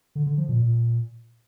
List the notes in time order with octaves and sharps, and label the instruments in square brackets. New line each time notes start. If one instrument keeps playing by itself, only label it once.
[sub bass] D3
D3
F3
A#2
A#2